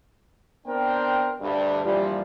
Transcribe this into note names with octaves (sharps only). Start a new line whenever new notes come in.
B3 C4 D4 A#4 C5 G5
D2 G2
G2 A#2 E3 F3 G3